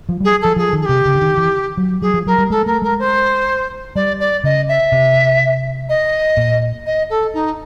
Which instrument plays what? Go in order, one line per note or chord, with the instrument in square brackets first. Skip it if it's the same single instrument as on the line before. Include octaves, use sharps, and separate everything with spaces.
[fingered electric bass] F3
G3
[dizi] G#4
[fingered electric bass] F3 [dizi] A4
[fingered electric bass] F3 [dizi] G#4
[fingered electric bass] D#3
[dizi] G#4
[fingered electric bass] C3 [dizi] G4
[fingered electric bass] C#3
D3
D#3
E3
F#3
[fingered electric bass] F#3 [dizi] G#4
[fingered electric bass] F3
[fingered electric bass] F#3 [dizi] A#4
[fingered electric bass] G3
[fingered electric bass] G#3 [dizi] A4
[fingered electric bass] A3 [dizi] A#4
[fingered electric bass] G#3 [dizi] A#4
[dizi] C5
[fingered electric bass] G3 [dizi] D5
[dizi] D5
[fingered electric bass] C#3 [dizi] D#5
[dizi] E5
[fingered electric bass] C3
[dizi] D#5
[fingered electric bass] A#2
[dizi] D#5
A4
D#4